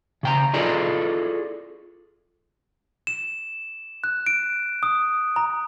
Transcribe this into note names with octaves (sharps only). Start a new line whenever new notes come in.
C#3 G5 A#5
E4 F4 G#4 A4 D5 D#5
E7
F#6
D7
D#6
A#5